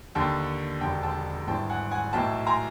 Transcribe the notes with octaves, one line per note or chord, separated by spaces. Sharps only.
D#2 D3 G5 A5
E1 D#2 D3 G5 A5
G5 A5
G#1 G2 E3 G5 A5
F#5 G#5
F#5 G#5
B1 A2 E3 G5 A5
G#5 A#5